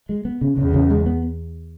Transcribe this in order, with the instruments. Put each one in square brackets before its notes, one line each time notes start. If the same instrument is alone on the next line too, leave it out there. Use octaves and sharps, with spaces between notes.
[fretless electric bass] G#3
B3
C#3
[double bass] E2 [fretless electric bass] C#3
[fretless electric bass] C#3
G#3
B3